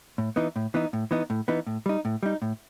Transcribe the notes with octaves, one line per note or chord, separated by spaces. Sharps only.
A2
E3 B3 D#4
A2
E3 B3 D#4
A2
E3 B3 D#4
A2
E3 B3 D#4
A2
G3 D#4
A2
G3 D#4
A2